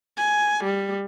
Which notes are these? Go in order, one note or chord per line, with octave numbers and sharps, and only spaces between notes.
G#5
G3